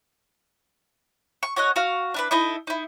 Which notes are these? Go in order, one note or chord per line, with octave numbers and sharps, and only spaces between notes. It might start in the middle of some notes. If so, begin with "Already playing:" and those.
C#6
F#4 C#5 D#5 F#5
F#4 F5
D4 E4 B4
D#4 E4 A4 D#5
D#4 E4